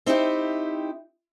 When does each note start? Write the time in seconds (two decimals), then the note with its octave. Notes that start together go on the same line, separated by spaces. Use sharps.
0.06 C4 D#4 E4 G4